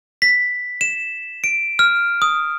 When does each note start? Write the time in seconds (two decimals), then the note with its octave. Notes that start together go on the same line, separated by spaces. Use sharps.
0.22 B6
0.81 E7
1.44 D7
1.79 F6
2.22 D#6